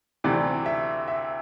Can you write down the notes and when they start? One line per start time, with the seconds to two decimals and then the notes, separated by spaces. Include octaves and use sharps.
0.24 D2 C3 E3 D5
0.66 E5
1.08 E5